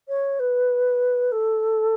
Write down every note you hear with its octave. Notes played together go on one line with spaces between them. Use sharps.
C#5
B4
A4